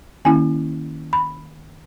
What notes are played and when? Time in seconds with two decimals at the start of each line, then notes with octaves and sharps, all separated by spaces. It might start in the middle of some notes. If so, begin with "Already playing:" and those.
0.25 D#3 A#3 C#4 E4 G#5
1.13 B5